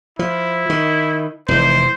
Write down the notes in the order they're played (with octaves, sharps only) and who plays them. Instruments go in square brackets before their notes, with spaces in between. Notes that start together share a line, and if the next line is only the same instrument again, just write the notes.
[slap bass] F3 [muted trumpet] E4
[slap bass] D#3
[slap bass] F1 A#2 E3 [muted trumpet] C5